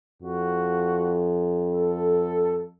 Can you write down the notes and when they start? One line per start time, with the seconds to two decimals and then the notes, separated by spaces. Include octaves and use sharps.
0.22 F2 F#4
1.75 A4